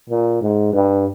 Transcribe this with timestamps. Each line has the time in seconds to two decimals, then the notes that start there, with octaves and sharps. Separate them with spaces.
0.10 A#2
0.42 G#2
0.73 G2